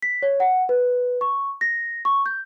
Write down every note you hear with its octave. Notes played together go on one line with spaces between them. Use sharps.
B6
C#5
F#5
B4
C#6
A#6
C#6
G6